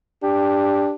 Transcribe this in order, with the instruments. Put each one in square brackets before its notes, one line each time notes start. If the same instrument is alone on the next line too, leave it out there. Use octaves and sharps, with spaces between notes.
[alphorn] D4 [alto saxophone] G4